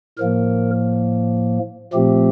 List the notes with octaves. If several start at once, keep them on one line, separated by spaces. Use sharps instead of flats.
A2 F3 A#3 A#4
A#2 F3 A3 C4 G4